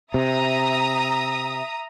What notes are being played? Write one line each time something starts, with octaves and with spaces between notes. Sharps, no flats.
C3 E5 A#5 D#6